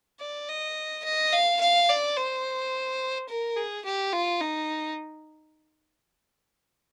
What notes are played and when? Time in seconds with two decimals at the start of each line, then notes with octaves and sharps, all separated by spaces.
0.20 D5
0.48 D#5
1.04 D#5
1.33 F5
1.61 F5
1.89 D5
2.17 C5
3.29 A#4
3.57 G#4
3.85 G4
4.13 F4
4.41 D#4